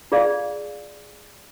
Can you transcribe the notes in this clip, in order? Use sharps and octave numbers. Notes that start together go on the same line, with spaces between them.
F4 G#4 D5 F5